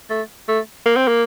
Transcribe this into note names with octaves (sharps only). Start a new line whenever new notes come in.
A3
A3
A#3
C4
A#3